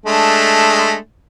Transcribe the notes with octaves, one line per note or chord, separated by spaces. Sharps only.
G#3 A3 D4